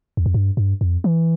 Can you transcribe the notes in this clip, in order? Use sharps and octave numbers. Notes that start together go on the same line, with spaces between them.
E2
F2
G2
G2
F2
E3